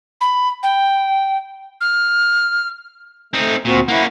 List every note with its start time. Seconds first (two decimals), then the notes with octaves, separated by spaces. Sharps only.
0.21 B5
0.63 G5
1.81 F6
3.34 A3 C4 D#4
3.65 D2 A#2 C4 F#4
3.88 A#3 C#4 E4 F#5